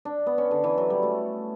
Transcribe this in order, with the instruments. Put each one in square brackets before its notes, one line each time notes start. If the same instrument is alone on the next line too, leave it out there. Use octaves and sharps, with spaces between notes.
[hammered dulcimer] D4
B3
C#4
D3
E3
F#3
G3
A3